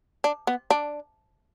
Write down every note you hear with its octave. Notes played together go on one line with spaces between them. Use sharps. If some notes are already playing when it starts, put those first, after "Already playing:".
D4
B3
D4